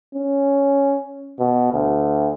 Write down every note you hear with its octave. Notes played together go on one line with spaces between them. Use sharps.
C#4
B2
D2